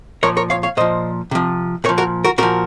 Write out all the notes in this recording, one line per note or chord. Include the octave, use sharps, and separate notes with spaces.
A#2 F3 A#4 C#5
A#4 C#5
C#5 F5
C#5 F5
A#2 F3 C5 D#5
C3 F3
A#2 F3 A#4 C#5
F#4 A#4
F#4 A#4
A#2 F3 F#4 A#4